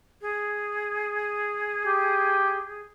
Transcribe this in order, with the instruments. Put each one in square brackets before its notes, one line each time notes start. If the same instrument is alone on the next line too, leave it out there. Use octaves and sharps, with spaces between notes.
[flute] G#4
[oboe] G4